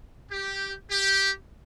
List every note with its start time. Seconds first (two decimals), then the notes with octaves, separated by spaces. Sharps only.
0.30 G4
0.90 G4